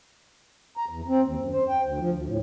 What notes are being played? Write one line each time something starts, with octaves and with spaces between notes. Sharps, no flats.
A#5
E2
C4
D#2
F#2
C5
G5
D2
F3
D2
A2